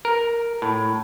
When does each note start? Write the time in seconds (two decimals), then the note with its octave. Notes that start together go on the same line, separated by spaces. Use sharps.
0.05 A#4
0.62 A2